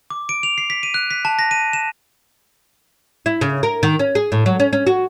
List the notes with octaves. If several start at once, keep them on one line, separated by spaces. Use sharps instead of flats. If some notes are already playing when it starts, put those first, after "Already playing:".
D6
D7
F7
C7
B6
D#7
F#6
B6
A5
A#6
D#7
E7
E4
C#3
A#4
D#3
C#4
G#4
A2
F#3
C#4
C#4
F#4